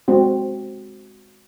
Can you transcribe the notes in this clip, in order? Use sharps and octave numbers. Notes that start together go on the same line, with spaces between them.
G#3 C4 F#4